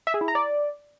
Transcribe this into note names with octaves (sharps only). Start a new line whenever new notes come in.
E5
G#4
E4
A#5
D5